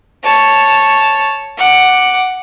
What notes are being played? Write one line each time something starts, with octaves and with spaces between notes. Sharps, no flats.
C#5 A5
F#5 D6